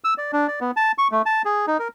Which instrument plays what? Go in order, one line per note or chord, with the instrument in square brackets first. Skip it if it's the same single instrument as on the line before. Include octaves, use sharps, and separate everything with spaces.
[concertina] E6
D5
D4
D5
B3
A5
C#6
A3
A5
G#4
D#4
A#4